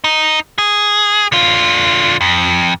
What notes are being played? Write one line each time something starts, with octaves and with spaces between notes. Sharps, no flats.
D#4
G#4
D3 F4
F2